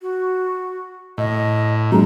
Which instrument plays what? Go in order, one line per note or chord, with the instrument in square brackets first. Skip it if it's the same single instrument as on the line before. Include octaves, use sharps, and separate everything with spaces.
[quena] F#4
[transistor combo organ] A2 [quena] D#5
[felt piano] F#3 G#3 D4 [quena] A#5